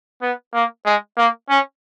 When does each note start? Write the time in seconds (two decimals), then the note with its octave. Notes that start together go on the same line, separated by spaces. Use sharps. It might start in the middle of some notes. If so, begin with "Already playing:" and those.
0.22 B3
0.54 A#3
0.85 G#3
1.17 A#3
1.49 C#4